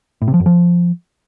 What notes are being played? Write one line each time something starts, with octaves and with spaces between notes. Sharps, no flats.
A2
C3
F3
F#2
F3